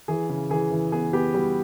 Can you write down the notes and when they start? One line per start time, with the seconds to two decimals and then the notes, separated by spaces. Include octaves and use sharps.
0.08 E3 G#4
0.29 C#3
0.50 E3 G#4
0.71 E3
0.92 B3 G#4
1.13 B3 G4
1.34 G3 F#4